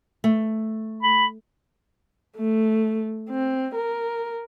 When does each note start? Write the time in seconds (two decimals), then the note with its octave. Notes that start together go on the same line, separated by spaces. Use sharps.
0.24 A3
1.03 B5
2.37 A3
3.30 C4
3.75 A#4